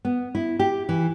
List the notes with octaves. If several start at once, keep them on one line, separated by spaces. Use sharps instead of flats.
B3
E4
G4
E3